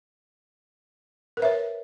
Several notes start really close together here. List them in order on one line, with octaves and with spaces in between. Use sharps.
A#4 B4 E5 C#5